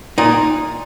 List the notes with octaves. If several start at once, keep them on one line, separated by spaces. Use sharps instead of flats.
A#2 D#4